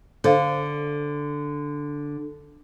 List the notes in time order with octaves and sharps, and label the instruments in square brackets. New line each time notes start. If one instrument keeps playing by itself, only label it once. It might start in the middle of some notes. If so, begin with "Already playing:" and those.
[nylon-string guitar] D3 [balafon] A4 C5 F5